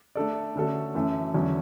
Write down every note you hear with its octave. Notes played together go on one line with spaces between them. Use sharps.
A3 D4 A4 D5
D3 A3 C#4 F#4 A4
F#2 E3 A3 C#4
E2 D3 F#3 A3 C#4